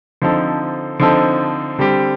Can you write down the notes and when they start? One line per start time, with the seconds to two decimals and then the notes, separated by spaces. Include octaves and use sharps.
0.22 D3 F3 C4 D#4 A4
1.00 D3 F3 C4 D#4 A4
1.79 D3 G3 C4 G4